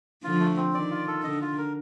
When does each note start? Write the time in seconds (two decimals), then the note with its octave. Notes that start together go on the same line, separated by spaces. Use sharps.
0.24 D3 F3 F4
0.40 A3
0.57 C4
0.74 D#3 D5
0.91 F4
1.08 A4
1.24 D3 D#5
1.42 F4
1.58 A#4